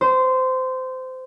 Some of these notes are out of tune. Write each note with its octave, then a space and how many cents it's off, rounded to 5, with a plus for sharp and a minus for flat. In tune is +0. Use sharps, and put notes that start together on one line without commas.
C5 -20